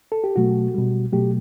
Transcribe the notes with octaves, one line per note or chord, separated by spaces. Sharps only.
A4
G4
B2 F#3 A3 F#4
B2 G3
B2 F#3 A3 G4